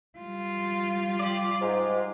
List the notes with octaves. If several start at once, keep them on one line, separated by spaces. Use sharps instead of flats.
G3 F4
G4 D5
G#2